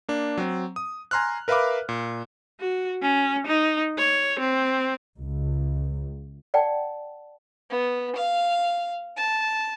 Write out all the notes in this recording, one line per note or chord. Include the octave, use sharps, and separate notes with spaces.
A#3 D4
F#3 C4
D#6
G#5 A#5 C6 F6 F#6
A#4 B4 E5 F5 B5 D6
A#2
F#4
C#4
D#4
C#5
C4
C#2
D5 F#5 G5 A5
B3
F5
A5